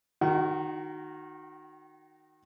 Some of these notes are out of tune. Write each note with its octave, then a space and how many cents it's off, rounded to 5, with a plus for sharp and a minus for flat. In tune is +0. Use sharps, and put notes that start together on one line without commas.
D#3 -10 F#4 +0 G5 -45